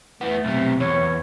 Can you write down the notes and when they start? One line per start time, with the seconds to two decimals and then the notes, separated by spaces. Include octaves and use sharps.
0.21 E3 A3 B3
0.45 B1 C3
0.80 E2 C#5